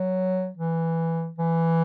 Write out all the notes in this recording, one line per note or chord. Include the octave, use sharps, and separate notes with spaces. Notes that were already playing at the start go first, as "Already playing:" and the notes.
Already playing: F#3
E3
E3